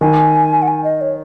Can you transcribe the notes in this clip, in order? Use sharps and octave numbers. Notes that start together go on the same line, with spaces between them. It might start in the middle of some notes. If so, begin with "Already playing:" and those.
D#3 G#5
F#5
G#5
D#5
C#5